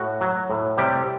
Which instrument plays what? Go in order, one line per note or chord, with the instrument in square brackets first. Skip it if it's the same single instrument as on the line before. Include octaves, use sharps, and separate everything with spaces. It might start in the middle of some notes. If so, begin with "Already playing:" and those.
Already playing: [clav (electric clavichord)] A2 F#4
F#3
A2
C3 G3 G4